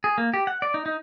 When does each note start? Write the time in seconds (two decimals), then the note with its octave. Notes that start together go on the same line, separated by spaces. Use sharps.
0.04 G#4
0.18 A#3
0.34 G4
0.47 F#5
0.62 D5
0.74 D#4
0.86 D#4